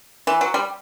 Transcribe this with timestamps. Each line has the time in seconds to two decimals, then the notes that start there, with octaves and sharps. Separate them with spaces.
0.27 E3
0.41 F#3
0.54 G3